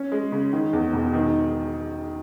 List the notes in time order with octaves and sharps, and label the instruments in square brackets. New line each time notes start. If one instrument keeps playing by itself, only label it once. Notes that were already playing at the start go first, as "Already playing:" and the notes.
Already playing: [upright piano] C#4
G#3
C#3
D#3
E2
E1
D#3